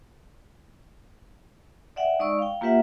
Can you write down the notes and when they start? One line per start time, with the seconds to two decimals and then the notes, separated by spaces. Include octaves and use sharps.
1.96 D5 E5 F#5 G5
2.19 G#3 D#4 D5 D#5 C#6 E6
2.39 F5 G5
2.61 A#3 F4 G4 B4 E5 F#5